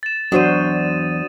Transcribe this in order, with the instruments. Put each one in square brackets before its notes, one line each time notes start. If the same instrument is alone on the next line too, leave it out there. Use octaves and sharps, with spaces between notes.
[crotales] A6 E7
[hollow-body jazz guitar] E2 G#2 F#3 [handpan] D4 F#4 C5 [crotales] D#6 D#7